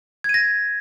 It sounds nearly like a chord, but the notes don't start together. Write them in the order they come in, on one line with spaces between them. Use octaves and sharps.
G#6 D#7 A#6